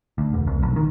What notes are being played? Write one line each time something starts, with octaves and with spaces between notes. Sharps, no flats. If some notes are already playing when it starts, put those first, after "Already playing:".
D2
E1
C2
B1
D#3